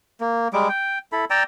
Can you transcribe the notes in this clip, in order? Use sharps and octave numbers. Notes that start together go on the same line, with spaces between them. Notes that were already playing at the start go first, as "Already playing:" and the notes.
A#3
G3 G#3 D6
G5
E4 A4 B5
D5 G5 A#5 E6